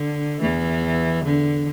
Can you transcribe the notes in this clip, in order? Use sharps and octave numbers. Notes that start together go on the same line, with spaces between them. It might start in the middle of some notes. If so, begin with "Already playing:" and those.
Already playing: D3
E2 E3
D3